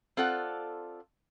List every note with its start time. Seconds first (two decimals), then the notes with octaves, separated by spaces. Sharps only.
0.17 C4 F4 A4 D5 F#5